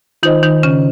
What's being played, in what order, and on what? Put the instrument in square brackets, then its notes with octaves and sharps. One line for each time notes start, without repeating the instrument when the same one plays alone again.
[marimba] D#3 D#4 [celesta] F4 C5 D#5
[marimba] D#3 D#4
C#3 C#4